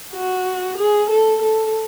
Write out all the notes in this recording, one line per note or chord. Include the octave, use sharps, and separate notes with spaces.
F#4
G#4
A4
A4